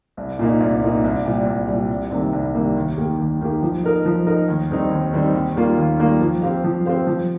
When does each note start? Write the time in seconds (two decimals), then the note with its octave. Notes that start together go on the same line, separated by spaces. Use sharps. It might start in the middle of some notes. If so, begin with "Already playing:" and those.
0.17 C2
0.39 A#2 A#3 D#4
0.60 C2
0.82 A#2 A#3 D#4
1.04 C2
1.25 A#2 G3
1.47 C2
1.68 A#2 G3
1.90 C2
2.11 C3 D#3 G3 A#3
2.33 C2
2.55 C3 D#3 G3 A#3
2.76 D#2
2.98 D#3 A#3 G4
3.19 D#2
3.41 D#3 A#3 G4
3.62 F3
3.84 D#4 A#4 D#5
4.06 F3
4.27 D#4 A#4 D#5
4.48 D#2
4.70 D#3 G3 C4 D#4
4.91 D#2
5.13 D#3 G3 C4 D#4
5.34 D#2
5.56 D#3 G3 A#3 F4
5.78 D#2
5.99 D#3 G3 A#3 F4
6.21 F3
6.42 C4 G4 C5 F5
6.64 F3
6.85 C4 G4 C5 F5
7.07 F3